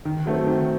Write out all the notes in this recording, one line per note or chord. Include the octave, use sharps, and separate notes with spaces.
D#3
F#3 A3 C4
D#3